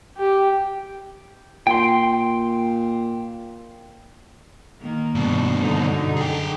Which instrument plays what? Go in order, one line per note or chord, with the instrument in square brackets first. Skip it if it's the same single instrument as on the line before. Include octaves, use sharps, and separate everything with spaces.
[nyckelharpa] G4
[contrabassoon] A#2 [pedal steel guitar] G5 C6
[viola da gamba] D#3 A#3
[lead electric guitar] G2 B2
[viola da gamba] F#2 D3 D#4
[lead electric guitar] G#4 G5